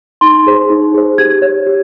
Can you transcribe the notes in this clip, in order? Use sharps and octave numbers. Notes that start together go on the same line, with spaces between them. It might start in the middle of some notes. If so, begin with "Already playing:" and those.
D#4 C6
G#4 C5
D#4
G#4 C5
G4 G#6
C#5
G4